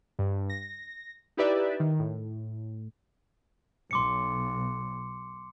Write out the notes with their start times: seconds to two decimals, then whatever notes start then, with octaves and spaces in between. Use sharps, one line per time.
0.19 G2
0.50 A#6
1.37 D#4 E4 G4 B4 D5 E5
1.80 D#3
1.99 A2
3.91 B1 C6 D6 C#7